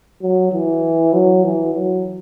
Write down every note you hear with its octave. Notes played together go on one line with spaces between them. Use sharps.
F#3
E3
F#3
E3
F#3